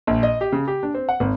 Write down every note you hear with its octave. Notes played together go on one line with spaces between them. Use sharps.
A#1
D#5
G4
C#3
G4
D4
C4
F#5
G#1